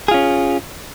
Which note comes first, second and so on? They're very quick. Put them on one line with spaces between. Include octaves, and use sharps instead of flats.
G#4 F4 C#4